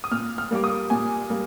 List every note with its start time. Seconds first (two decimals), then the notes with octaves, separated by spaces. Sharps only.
0.04 D#6
0.11 A#2 F6
0.38 F6
0.51 G3 A#3 D6
0.64 D#6
0.90 A#2 G#5
1.30 G3 A#3